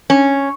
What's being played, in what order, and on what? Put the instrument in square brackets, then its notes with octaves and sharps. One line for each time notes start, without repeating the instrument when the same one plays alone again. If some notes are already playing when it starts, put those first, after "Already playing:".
[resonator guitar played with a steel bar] C#4